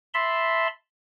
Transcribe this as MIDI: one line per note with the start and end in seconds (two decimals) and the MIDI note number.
0.14 0.67 76
0.14 0.67 81
0.14 0.67 83
0.14 0.67 84